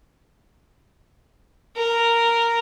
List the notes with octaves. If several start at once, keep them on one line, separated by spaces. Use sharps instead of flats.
A#4